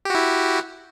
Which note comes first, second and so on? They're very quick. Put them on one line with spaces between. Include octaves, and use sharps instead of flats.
G4 F#4 E4